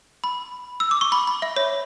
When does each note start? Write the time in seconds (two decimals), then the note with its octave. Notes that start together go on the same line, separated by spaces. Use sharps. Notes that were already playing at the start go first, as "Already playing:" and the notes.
0.24 B5
0.80 E6
0.91 D6
1.01 C#6
1.12 B5
1.27 B5
1.42 E5
1.56 C#5